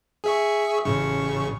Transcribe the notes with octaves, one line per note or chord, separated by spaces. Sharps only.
G#4 E5 C#6
A1 C#3 C#6